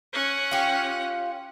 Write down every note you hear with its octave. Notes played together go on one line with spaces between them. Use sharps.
C#4 F#5
F4 G4